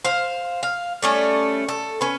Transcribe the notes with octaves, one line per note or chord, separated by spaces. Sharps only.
C5 F5
F5
G3 A3 C#4
A4
C#4 B4